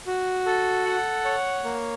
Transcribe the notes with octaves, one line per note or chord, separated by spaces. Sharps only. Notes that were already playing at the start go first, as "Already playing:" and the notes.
F#4
A4
F#5
C#5
A#3